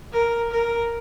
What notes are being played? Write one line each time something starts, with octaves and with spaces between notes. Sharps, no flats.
A#4
A#4